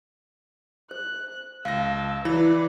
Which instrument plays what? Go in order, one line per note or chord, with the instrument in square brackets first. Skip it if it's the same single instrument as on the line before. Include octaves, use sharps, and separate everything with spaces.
[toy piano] C5 [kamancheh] F#6
[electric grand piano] C#2 A#6 [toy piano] F5 [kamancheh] A5 E6
[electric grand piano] E3 [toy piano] E4 C#5 B5 [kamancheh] B4 D5